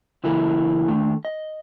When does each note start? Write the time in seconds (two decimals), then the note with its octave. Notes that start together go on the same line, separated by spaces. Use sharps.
0.24 C#3 E3 F#3 A#3 E4 A4
0.88 D3 D#3 A3
1.25 D#5